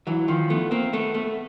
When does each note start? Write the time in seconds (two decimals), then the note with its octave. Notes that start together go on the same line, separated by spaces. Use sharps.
0.07 E3 F#3
0.28 D#3 F3
0.50 A3 B3
0.71 A#3 C4
0.93 A3 B3
1.14 A3 B3